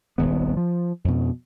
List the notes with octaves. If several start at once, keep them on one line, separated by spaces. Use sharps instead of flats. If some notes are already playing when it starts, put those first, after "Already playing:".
D#1 G#1 G#2 B3
F3
F2 B2